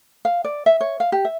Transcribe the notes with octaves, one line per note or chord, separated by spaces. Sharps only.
F5
D5
E5
C#5
F5
G4
E5